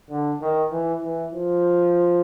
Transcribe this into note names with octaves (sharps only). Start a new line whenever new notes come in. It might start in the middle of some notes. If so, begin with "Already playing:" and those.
D3
D#3
E3
E3
F3